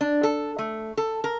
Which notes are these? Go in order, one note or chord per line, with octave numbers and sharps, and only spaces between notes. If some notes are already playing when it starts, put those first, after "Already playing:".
D4
A4
A3
A4
A#4